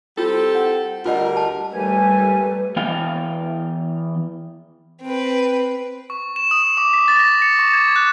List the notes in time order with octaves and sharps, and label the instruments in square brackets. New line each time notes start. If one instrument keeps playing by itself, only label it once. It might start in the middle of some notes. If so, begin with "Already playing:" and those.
[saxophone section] G3 C4 A4 [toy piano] E4 F4 E6
[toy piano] F#5
[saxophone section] D2 G3 A#4 [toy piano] F4 D#5 F#5
[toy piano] A5
[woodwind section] D#2 G4 G#5 [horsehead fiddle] G3 A3 [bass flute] B4
[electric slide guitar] E3 B3 F5 G5
[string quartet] C4 B4
[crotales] C#6
E7
D#6
D6
B6
A6
A#6
C#7
C#6
G#6
F#6